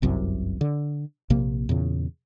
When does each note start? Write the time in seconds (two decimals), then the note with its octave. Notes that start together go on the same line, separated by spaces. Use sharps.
0.02 G1 C2 F#2 C3
0.61 D3
1.30 A#1 C3 A#3
1.69 E2 A#2 C#3